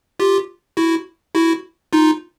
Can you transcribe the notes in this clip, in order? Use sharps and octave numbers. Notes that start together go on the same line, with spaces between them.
F4 G4
E4 F#4
E4 F#4
D#4 F4